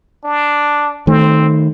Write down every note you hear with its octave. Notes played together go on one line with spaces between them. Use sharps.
D4
D#3 A3 C4